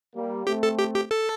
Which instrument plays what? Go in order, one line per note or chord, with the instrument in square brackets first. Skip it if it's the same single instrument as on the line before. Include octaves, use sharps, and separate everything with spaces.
[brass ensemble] G3 A#3
[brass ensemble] A3 C4 [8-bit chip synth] G4
[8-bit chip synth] A4
G4
G4
A4